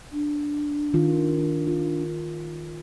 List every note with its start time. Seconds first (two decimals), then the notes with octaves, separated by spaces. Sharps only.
0.12 D4
0.94 D#3 F4
1.68 F4